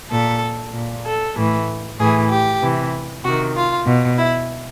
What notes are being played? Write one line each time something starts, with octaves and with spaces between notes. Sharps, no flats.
A#2 A4
A#2
A4
A2 E3
A2 E3 G#4
G4
C3 E3
C3 D#3 F#4
F4
B2
E4